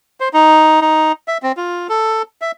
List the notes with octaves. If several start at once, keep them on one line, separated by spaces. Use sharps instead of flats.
C5
D#4
D#4
E5
C4
F4
A4
E5